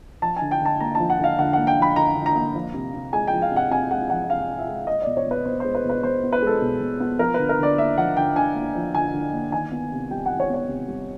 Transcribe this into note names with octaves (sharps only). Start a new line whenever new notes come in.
F3 A5
G#5
D3
G5
D3 A5
A#3 A#5
F3 A5
F#5
D3 F5
D3 F#5
A#3 F#5
G5
F3 B5
D3 A#5
D3
A#5
A#3
F3
C3
C3
G#3 G#5
G5
F3
F5
C3 F#5
C3 G#5
G#3 F#5
F3 F#5
C3 F5
C3
E5
G#3
G#3 D#5
D5
B2
C#5
B2 B4
B3 C5
G#3 C5
B4
B2
B4
B2 C5
B3
B4
G#3 A4
B2
B2
B3
F3 A#4
D3 B4
A#4
D3 D5
A#3 E5
F3 F#5
D3 G5
D3 G#5
A#3
F3
D3 G#5
D3
A#3
D#3 G#5
B3
C3
G3 G5
D#3 F#5
C#5
B3 C#5
C3
G3